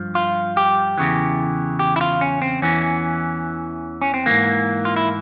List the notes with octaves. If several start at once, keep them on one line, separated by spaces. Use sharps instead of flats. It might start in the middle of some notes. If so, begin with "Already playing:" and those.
Already playing: G2 F3
F4
G4
E2 C#3 E3
G4
E4
F4
C#4
C4
E2 E3 C#4
C#4
C4
G#2 E3 A#3
F4
E4